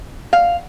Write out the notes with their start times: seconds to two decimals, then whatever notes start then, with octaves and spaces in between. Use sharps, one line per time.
0.33 F5